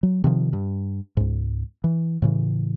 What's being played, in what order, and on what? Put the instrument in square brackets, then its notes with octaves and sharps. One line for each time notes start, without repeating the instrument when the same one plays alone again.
[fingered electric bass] F#3
C3 D#3 F3
G2
C#2 G#2
E3
A2 C#3 E3